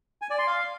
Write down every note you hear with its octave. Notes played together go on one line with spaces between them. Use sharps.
G#5
D5
C6
F5